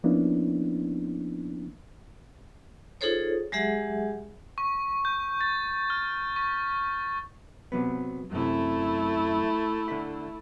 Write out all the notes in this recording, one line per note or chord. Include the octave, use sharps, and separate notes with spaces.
F3 A#3 B3 C#4 D4 E4
D#4 F4 G#4 A4 C5 C#5
F#3 G#3 G4 G#4 E5 F#5
C#6
G6
A6
F6
C#6
C3 F#3 B3
F#2 C3 A3 E4
D3 B5